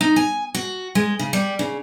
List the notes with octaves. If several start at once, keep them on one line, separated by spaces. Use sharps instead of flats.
D#4
G#5
F#4
G#3
C#3
G3
C#3